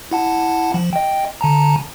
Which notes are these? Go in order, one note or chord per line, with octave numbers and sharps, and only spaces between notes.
E4 F#5 A5
F3
D#5 G5
D3 A5 A#5